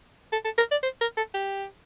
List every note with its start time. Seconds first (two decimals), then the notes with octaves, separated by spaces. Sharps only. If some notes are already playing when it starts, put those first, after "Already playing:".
0.32 A4
0.45 A4
0.58 A#4
0.71 D5
0.83 C5
1.01 A#4
1.17 A4
1.34 G4